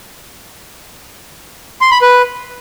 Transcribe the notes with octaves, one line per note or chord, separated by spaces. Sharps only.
C6
B5
B4